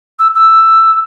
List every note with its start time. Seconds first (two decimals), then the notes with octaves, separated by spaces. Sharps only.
0.19 E6
0.35 E6